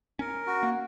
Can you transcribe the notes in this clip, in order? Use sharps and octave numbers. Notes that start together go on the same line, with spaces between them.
C#4 A#4
F#4
A#3